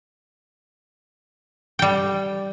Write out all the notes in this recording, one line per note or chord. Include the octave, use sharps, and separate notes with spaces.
G3 G5